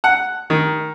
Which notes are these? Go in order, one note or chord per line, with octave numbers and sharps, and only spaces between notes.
F#5
D#3